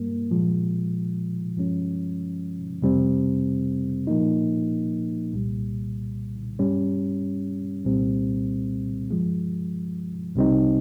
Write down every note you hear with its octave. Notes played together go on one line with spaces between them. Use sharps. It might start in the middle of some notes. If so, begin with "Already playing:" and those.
Already playing: G2 G3 A#3
A#2 F3 G#3
G2 F3 G#3 C#4
F2 C3 G3 C4
A#2 F3 A#3 D#4
C2 A#2 G3
G2 G3 C#4
C2 A#2 G3 C4
G2 F3 G#3
C2 C3 G3 C4 D#4